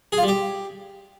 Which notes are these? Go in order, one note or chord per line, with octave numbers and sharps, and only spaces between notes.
G#4
F4
G3
G4